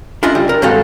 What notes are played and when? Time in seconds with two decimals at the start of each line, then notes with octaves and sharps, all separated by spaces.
0.23 C#4 D4 E4 F4 D#5
0.35 G3
0.49 A#4
0.62 G2 D#3 G#3 F#4 A4 F5